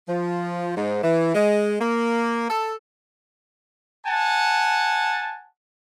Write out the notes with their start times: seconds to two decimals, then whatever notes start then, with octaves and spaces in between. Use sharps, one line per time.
0.08 F3
0.76 G#2
1.03 E3
1.34 G#3
1.80 A#3
2.50 A4
4.06 F#5 G#5 A5